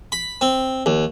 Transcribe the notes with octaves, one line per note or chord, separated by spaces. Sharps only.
B5
C4
D#2